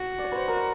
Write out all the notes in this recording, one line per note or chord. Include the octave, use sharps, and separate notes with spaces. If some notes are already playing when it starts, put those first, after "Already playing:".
Already playing: F#4
D5
C#5
B4 C5
A#4